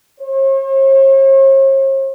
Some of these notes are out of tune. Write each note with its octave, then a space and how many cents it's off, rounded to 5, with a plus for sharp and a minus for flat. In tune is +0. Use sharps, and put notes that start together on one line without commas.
C#5 -45